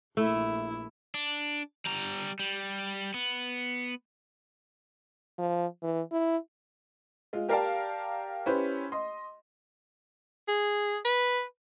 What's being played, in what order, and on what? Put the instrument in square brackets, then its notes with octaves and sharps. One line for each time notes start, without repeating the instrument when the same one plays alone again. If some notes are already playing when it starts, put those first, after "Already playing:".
[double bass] A#1 E4 [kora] A3
[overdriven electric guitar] D4
G3 A#5
G3
B3
[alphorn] F3
E3
E4
[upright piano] G#3 F4
G4 A#4 D5 F5 G5 A5
C#4 E4 G4 B4 C5
D#5 C6
[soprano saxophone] G#4
B4